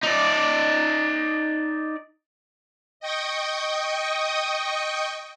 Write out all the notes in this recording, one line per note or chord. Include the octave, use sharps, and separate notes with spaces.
D#4 D5
D#5 G5 C#6 D#6